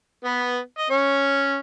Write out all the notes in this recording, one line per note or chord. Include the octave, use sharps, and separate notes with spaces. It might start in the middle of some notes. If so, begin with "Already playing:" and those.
B3 B4
D#5
C#4 C#5